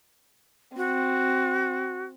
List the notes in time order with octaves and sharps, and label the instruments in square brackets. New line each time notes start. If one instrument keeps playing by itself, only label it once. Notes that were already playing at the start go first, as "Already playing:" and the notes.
[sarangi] C4 [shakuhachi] F#4